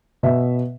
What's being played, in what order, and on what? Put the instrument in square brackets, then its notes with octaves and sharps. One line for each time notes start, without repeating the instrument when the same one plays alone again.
[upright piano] B2 E5